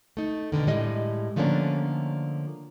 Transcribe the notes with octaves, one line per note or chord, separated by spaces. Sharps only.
A3 D#4
B2 D3 D#3
A2 G3 G#3 D#5
D3 F3 A3 A#3 C#4 D4